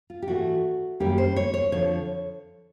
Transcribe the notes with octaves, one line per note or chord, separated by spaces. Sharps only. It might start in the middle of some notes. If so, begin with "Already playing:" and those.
F4
G4
G#2 E3 A3 F#4
F#2 D#3 G3 A#3 C#4 G4
C5
C#5
C#5
F2 D3 F3 C#5